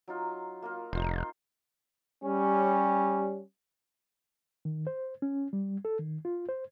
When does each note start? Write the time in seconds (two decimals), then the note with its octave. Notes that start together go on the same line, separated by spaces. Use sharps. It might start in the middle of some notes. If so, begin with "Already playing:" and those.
0.08 F#3 D#4 F4
0.62 A#3 F4 A#4
0.93 F1 D#4 F4 C5
2.24 G3 C#4
4.65 D#3
4.87 C5
5.22 C#4
5.53 G3
5.85 A4
5.99 D#3
6.25 F4
6.49 C5